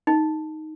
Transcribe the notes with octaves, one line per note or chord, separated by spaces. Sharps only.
D#4